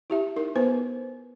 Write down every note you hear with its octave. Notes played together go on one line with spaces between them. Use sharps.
E4 G4 E5
D#4 A#4
B3 F4 B4 C5